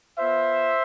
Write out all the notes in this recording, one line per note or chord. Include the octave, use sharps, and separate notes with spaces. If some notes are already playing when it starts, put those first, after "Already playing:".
B3 F4 C5 E5